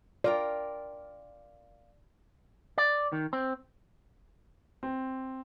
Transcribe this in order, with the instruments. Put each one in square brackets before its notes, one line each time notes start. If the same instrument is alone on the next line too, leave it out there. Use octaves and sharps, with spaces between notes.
[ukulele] F4 A#4 G5 [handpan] D5
[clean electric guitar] D5
D#3
C4
[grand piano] C4